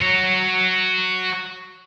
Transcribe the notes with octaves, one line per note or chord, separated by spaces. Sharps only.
F#4 C#5